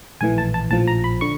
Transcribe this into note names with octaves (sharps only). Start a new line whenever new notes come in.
A#1 A2 E3 G#5
A5
A5
A#1 A2 F3 A5
A#5
B5
D3 C#6